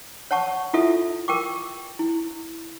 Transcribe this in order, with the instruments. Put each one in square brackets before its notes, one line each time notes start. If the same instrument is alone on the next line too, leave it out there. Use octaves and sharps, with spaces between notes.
[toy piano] C#5 F#5 A5 C#6
E4 F4 A4 E5
A#4 G5 C#6 D6
E4